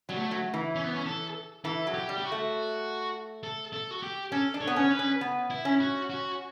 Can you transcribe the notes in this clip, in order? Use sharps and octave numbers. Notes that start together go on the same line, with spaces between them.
F#3 G3
A3
F#3
E3
C#4
B3
C#4
A4
E3 A4
F#3
G4
G3
G4
F#4
A3
A4
A4
F#4
G4
C#4 A4
D4
C#5
B3
C#4 C#5
B4
C#4
B3
E4
C#4
F#4
F#4